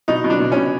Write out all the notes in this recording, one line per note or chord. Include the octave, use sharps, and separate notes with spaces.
B2 D#4
B2
D4
B2
C#4
B2